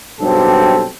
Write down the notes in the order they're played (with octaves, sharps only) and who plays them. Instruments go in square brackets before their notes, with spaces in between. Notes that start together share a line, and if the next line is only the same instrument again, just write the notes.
[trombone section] B1 G2 F#3 C4 G4 A4